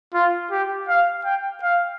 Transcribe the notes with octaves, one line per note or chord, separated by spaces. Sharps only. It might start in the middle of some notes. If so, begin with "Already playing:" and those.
F4
G4
F5
G5
F5